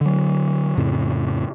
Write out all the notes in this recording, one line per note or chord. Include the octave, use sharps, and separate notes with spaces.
D3 F#3
F2 A2 C#3